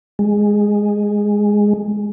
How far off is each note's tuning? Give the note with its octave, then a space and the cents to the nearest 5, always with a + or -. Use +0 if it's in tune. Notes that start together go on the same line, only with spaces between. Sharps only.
G#3 -5